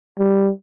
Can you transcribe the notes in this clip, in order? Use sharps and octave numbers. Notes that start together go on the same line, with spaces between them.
G3